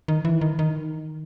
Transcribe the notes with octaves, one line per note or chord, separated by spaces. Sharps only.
D#3
E3
D#3
D#3